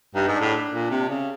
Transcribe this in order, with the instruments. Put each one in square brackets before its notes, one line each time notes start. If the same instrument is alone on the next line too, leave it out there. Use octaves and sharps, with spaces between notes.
[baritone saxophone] G2 [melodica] D#4
[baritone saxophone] G#2
[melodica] D4
[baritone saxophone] A2
A#2
C3
C#3